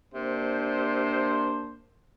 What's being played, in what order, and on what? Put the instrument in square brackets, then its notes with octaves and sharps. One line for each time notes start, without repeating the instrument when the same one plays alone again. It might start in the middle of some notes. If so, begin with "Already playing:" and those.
[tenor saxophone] C3 [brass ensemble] A#3 D4 C5